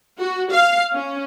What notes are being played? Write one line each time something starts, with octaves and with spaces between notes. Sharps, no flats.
F#4
F5
C#4